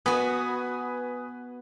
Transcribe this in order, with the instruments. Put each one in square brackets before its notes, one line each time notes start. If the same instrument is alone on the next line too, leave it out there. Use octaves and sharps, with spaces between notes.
[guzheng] B3 F#4 [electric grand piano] B4 G#5 D#6